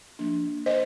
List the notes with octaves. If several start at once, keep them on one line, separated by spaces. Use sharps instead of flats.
F3 A#3 D4
C5 D#5